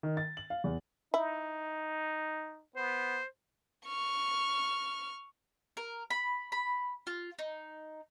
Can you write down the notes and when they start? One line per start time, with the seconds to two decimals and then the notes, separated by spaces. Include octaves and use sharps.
0.03 D#3
0.17 A6
0.37 F#7
0.50 F5
0.64 E2
1.14 D#4 E4
2.76 B3 C5
3.86 C#6 F6
5.77 A#4
6.10 B5
6.52 B5
7.07 F4
7.39 D#4